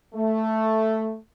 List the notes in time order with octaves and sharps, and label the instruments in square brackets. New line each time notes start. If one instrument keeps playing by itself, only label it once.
[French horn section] A3